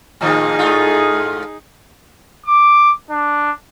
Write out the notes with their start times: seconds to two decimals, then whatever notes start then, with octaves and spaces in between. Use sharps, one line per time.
0.21 A2 D#3 F3 D#4 G#4
0.59 G#2 A3 F4
2.46 D6
3.10 D4